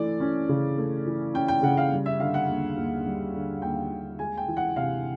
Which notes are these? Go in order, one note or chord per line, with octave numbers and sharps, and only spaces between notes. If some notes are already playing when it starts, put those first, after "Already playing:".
Already playing: E3 A3 D5
C#4
C#3
A3
E3
C#4 G5
G5
C#3 F#5
F5
G3
E5
D3 F5
F#5
D#2
D#2
G3
D3
D#2 G5
D#2
G#3 G#5
G5
E3
F#5
C3 F5